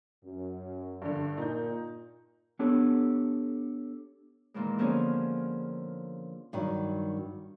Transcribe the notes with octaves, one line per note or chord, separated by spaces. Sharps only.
F#2
G2 D3
A#2 D#4 G6
B3 D4 G4 A4 C#5
A#2 D#3 E3 G#3
D3 F3 A#3 B3 C#4 G#4
G2 D#3 F#3